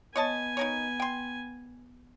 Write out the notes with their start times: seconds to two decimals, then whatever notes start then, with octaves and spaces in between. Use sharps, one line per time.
0.16 B3 C#5 D#5 G#5 A5
0.57 D#4 A#4 C#5
1.00 G5 C6